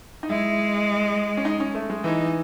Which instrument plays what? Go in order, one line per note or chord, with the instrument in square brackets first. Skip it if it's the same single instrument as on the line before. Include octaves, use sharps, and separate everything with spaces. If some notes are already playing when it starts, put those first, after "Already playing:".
[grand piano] D#4
[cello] G#3 [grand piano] E4
[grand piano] C#4
D#4
C#4
A3
G#3
[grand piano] E3 [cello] D#4